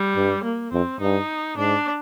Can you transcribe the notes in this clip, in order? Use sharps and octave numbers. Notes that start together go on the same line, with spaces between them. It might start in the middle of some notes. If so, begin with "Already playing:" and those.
Already playing: G3
G2
A#3
F2 C4
G2 D#4
G#2 D4